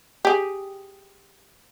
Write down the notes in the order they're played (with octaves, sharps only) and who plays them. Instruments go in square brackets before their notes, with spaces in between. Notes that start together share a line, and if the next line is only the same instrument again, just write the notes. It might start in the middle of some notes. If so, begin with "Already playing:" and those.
[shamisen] G4 G#4